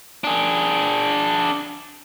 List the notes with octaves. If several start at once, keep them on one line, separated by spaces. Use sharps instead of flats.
D4 G#4